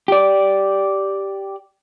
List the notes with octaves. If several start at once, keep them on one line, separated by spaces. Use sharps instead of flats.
G4 D5